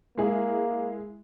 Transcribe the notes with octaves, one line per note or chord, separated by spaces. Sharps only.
G#3 A#3 E4 G#4